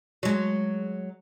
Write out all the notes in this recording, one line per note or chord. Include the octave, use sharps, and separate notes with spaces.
F#3 G#3